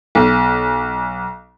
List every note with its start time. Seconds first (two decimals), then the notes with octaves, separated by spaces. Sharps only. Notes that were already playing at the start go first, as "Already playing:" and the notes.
0.15 B1